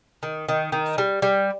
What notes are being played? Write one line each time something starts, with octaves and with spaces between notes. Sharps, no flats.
D#3
D#3
D#3
G3
G3